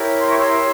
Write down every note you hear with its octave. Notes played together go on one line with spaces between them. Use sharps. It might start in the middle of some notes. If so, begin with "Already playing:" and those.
Already playing: E4 G4 A#4 C#5
C6
C#6
C6 E6